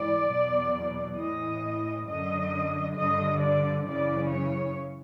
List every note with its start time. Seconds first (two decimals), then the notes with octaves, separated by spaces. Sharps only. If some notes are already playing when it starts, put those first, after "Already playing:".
Already playing: G#2 E3 D5
0.30 E2 B2 F#3
1.18 A2 E3 D#5
2.07 F#2 D3 F#3 D#5
2.97 G2 D3 F3 D#5
3.42 D5
3.86 F#2 C#3 E3 D5
4.31 C#5